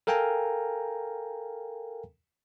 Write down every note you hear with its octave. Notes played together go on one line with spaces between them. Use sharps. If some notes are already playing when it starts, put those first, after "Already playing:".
A4 A#4 F5 G5 G#5 A#5